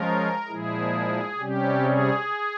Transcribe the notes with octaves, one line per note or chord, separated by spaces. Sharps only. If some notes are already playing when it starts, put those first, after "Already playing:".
Already playing: F3 G#3 C#4 F4 A#4
A#2 F3 G#3 E4 G#4
C3 G3 C#4 G4
G#4